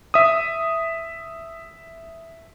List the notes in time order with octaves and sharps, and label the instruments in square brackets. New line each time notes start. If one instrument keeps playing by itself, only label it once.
[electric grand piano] E5 D#6